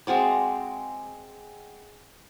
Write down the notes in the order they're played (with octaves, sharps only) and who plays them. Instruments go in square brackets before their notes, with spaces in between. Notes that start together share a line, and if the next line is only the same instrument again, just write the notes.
[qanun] G#3 C4 F#4 D5